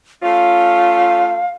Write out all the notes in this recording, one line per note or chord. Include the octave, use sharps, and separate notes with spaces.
A3 C#4 F4 F5